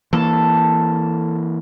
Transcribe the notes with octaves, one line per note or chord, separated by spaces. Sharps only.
E3 A#3 A4